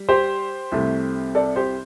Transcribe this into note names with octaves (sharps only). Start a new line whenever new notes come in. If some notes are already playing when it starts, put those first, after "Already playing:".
Already playing: G3
G4 C5
C2 C3 A3
A4 D5
G4 C5